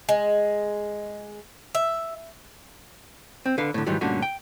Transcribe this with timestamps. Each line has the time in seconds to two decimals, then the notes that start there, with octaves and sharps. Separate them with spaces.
0.09 G#3
1.75 E5
3.46 C4
3.58 D3 B4 F5
3.74 A2 D3
3.86 G#2 D#3 E3 F#3 G3
4.01 G2 A#2 D3 A3 C#4 F#4
4.22 G5